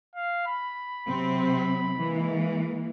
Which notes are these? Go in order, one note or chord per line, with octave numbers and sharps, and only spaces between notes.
F5
B5
C3 F#3 C4
E3 G#3 A#3